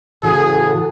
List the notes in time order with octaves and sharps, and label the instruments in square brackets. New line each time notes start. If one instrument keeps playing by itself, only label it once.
[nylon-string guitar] A2 C#3 E3 [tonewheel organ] F#4 A4 [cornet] G#4